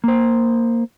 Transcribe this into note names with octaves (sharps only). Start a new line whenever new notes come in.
A#3 C5